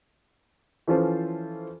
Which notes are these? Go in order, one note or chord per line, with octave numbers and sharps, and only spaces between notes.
E3 F3 C#4 F4 A4 C5